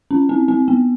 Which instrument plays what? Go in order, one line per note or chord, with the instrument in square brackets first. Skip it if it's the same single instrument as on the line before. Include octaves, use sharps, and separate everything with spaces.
[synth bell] C#4
C4
C4
B3